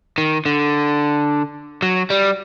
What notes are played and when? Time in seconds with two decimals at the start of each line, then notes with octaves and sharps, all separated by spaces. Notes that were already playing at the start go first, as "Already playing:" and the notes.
0.18 D#3
0.46 D3
1.82 F#3
2.10 G3